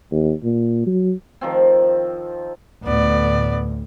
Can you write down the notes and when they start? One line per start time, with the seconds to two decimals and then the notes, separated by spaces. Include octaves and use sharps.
0.12 D#2
0.43 A#2
0.87 F#3
1.41 D#3 F3 C4
2.84 D2 A2 B3 D5